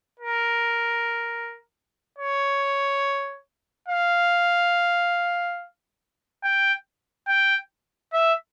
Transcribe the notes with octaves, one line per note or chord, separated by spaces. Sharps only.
A#4
C#5
F5
G5
G5
E5